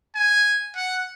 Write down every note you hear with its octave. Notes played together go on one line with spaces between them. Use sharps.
G#5
F#5